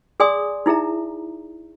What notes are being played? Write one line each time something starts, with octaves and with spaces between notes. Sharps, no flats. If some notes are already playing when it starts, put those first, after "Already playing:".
G#4 D5 G#5 C6 D#6
D#4 E4 G#4 E5 A#5